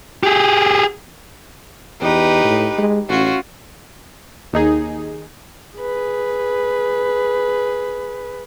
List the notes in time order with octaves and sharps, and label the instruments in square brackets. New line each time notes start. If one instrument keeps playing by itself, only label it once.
[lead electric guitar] G4 G#4
[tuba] E2 [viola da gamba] D#4 G4 B4
[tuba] A2
G#3
[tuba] A1 [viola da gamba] C#4 F4 F#4
[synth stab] D#2 D#4 G#4
[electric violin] G#4 B4